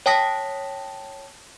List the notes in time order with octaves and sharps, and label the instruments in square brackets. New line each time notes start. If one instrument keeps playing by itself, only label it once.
[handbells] C#5 G5 A5 D#6 A#6 B6